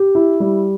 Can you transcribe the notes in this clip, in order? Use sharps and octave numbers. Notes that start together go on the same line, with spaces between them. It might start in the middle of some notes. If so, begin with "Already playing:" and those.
Already playing: G4
E4
G3